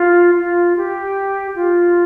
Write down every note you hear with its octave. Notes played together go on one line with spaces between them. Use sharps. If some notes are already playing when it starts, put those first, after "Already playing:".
Already playing: F4
F4
G4
F4